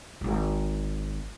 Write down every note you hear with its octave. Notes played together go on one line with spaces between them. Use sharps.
D1 G#1